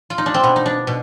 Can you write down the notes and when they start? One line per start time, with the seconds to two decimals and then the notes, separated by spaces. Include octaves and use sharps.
0.10 F4
0.18 D#4
0.26 D4
0.34 C4
0.43 B2 B3
0.56 D#4
0.66 D4
0.87 B2